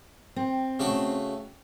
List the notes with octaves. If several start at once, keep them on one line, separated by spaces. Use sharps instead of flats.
C4
C#3 A3 F#4